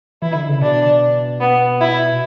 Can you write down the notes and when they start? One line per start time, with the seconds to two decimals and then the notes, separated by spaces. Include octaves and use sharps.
0.22 E3 E4
0.35 D3
0.49 C#3
0.61 B2 D4
1.40 B3
1.81 E4